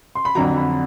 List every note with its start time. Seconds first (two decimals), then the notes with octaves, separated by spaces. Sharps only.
0.15 C6
0.25 B5
0.35 F2 D3 F#3 A#5
0.57 B5